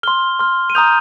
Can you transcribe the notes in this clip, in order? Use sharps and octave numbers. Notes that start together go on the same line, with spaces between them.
C6 F6 G7
C6 F6
D#7
A#5 D#6 G6 F7